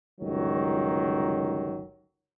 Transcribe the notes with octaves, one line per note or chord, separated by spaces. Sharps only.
G1 C#2 D#3 F#3